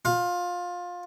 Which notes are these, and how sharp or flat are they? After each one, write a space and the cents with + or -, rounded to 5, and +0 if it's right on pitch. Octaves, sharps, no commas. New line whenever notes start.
F4 +20